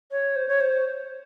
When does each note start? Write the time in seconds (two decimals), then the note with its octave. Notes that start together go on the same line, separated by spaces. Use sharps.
0.12 C#5
0.36 C5
0.48 C#5
0.60 C5